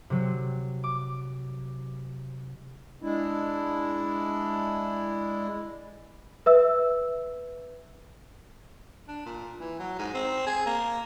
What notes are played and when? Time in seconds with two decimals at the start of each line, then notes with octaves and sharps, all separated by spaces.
0.10 C3 F#3
0.84 D6
3.02 G#3 D4 E4
6.46 B4 E5 E6
9.08 D4
9.26 A#2
9.60 E3
9.79 F#3
9.99 G#2
10.14 C4
10.47 G#4
10.66 A#3